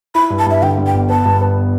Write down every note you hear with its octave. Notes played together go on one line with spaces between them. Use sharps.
E4 B5
G2
A5
G2 E5
D3 G5
G2
G5
G1
B3 A5
G2
B3